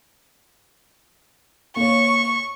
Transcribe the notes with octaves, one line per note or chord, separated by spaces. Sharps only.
A#3 C#5 C#6